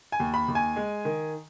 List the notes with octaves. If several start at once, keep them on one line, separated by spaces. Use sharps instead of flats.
G#5
D#2
B5
D#2
G#5
G#3
D#3